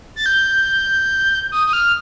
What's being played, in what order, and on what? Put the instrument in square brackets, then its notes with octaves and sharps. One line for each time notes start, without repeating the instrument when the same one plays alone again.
[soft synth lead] A6
G6
D#6
D#6
F6